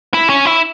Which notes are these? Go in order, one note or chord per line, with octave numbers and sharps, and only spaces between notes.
E4
C#4
E4